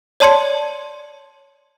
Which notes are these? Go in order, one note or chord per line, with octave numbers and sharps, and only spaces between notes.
C#5 D5 A5 C6 G#6 C#7